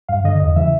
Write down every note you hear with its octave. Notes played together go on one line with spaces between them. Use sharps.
G2 F5
D3 D#5
E2 D#5
C#3 E3 E5